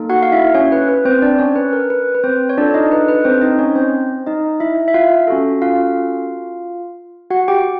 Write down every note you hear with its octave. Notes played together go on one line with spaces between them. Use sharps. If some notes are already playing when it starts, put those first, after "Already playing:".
Already playing: A#3 D#4 A4
F#4 F#5
F5
E4 E5
C#4 C#5
B4
B4
C4 C5
D4 D5
C#4 C#5
B4
A#4
B4
B4
C4 C5
C#5
D4 F4 A4 D5
D#4 D#5
B4
B4
C4 C5
D#4 D#5
C#4 C#5
C4 C5
D#4 D#5
E4 E5
E5
F4 F5
C#4 F#4 A4
F4 F5
F#4 F#5
G4 G5